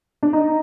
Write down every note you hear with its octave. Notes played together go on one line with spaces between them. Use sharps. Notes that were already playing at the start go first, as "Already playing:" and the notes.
D4
D#4